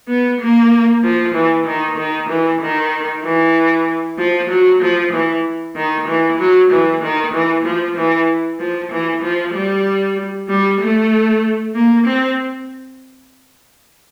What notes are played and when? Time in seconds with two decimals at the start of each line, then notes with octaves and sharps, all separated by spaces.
0.08 B3
0.41 A#3
1.03 F3
1.35 E3
1.66 D#3
1.98 D#3
2.29 E3
2.61 D#3
3.24 E3
4.18 F3
4.50 F#3
4.82 F3
5.13 E3
5.76 D#3
6.08 E3
6.39 F#3
6.71 E3
7.02 D#3
7.34 E3
7.65 F3
7.97 E3
8.60 F3
8.92 E3
9.23 F3
9.54 G3
10.49 G3
10.80 A3
11.75 A#3
12.06 C4